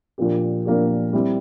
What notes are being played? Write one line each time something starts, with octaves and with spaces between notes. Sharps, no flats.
A#2 F3 A#3 D4 G4
A#2 F3 A#3 D4 G4
G3 C4 E4 G4